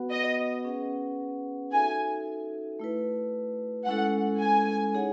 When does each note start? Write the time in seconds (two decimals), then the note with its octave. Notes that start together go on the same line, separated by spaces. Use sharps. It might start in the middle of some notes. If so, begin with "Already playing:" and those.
Already playing: B3 F#4 B4 F#5
0.11 D#5
0.65 C#4 G#4 B4 F#5
1.71 D#4 F#4 A4 E5 G#5
2.80 A3 E4 B4
3.86 G#3 C#4 E4 A4 F#5
4.41 G#5
4.95 D#4 G#4 C#5 F#5